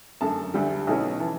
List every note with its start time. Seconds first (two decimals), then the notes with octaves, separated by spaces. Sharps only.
0.21 F#2 D3 A3 A5
0.54 D2 D3 G3
0.87 B1 B2 A3 C#4 E4
1.20 E3 A5